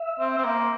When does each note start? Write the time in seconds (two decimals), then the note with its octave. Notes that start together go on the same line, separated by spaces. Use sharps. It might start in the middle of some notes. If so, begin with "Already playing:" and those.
Already playing: E5
0.20 C4
0.38 C4
0.44 A#3